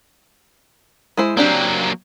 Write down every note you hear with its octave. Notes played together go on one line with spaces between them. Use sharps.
G#3 E4 C5
F#3 A#3 C4 D4 G4